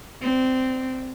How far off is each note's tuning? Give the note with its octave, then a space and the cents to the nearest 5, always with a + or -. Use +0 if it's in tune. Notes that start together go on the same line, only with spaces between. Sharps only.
C4 -15 D5 +0